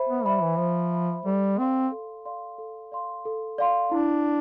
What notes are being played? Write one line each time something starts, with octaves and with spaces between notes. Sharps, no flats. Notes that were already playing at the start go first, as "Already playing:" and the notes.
Already playing: C5 E5 B5
B3
G3 E5 B5
E3
F3 C5
E5 B5
G3 A4
C4 D5 F5 C6
A4
D5 F5 C6
A4
D5 F5 C6
A4
D5 F5 C6
D4 E4